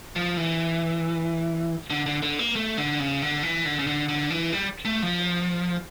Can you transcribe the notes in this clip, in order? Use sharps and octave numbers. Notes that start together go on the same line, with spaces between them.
F3
E3
D3
D3
D3
A#3
A3
D3
C#3
D3
E3
D3
C#3
D3
D3
E3
G3
A3
F3